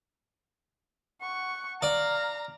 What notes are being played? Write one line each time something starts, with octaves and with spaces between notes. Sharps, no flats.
F#5 C#6
D5 F5 A#5